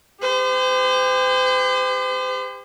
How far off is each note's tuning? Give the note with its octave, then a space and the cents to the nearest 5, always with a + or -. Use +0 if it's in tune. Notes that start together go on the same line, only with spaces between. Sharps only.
G4 +30 C5 -40